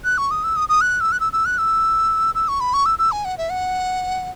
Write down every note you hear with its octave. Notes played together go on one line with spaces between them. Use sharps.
F#6
C#6
D#6
E6
D#6
D#6
F#6
E6
F#6
E6
E6
F#6
E6
E6
C#6
B5
C#6
E6
E6
G#5
F#5
E5
F#5